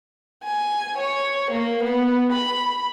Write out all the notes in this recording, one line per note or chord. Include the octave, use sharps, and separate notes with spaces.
G#5
C#5
A#3
B3
B5